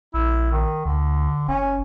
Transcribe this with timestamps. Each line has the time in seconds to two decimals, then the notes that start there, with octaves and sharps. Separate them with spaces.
0.14 A#1 E4
0.52 D#3
0.85 D2 D3
1.48 F#1 C#4